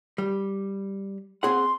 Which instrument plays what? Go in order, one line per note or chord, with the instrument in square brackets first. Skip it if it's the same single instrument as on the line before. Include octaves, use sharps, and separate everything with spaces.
[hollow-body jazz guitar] G3
[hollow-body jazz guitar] C4 G#4 F#5 [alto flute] C6